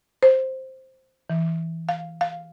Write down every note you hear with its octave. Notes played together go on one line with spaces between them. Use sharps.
C5
E3
F5
F5